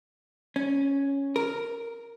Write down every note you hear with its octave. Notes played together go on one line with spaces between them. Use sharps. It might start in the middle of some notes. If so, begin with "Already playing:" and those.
C#4
A#4